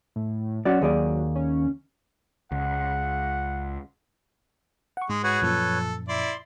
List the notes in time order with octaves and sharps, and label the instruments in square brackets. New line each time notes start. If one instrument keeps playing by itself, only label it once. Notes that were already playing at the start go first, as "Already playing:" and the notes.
[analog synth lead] A2
[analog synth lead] F#3 [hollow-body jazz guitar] C#4 F#4 D5
[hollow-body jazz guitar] D#2 G#4 D5
[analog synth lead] C#4
[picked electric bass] C#2 [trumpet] F#5
[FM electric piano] F#5 C#6
[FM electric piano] G#2 [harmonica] G#3
[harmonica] F#4 G#4 [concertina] B4 C#5
[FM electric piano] F#2 A#2 F3 [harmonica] A4
[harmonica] E4 D5 [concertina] C6